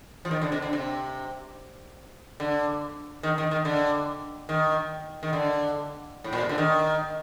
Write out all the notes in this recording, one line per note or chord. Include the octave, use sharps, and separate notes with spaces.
F3
D#3
D3
C3
D3
C3
D3
D#3
D#3
D#3
D3
D#3
D#3
D3
A2
A#2
C3
D3
D#3